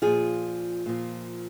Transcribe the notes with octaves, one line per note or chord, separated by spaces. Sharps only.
A#2 F3 F4 G#4
A#2 F3